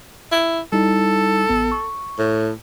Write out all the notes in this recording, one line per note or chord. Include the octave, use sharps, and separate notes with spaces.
E4
G3 D#4 E4 A4
A1 B3
C#6
A2